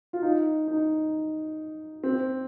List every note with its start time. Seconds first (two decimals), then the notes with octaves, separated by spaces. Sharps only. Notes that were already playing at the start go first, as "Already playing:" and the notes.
0.13 F4
0.22 D#4
0.68 D#4
2.03 C4